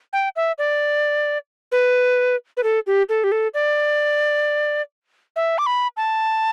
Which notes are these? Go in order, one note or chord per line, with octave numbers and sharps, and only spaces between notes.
G5
E5
D5
B4
B4
A4
G4
A4
G4
A4
D5
E5
D6
B5
A5